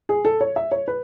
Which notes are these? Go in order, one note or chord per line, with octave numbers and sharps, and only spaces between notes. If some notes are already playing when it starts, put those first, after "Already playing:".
G#4
A4
C#5
E5
C#5
B4